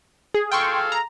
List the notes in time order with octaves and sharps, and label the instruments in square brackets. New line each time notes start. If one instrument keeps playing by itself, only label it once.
[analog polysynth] G#4
[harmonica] G#4 A4 F5 [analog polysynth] G5 C6 C#6
[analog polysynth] A#5